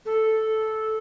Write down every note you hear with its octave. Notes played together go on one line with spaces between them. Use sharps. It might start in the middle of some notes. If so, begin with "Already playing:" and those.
A4